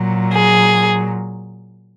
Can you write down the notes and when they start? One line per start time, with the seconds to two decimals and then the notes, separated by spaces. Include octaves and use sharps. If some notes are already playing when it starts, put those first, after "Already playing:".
Already playing: A#2 F#3
0.32 G#4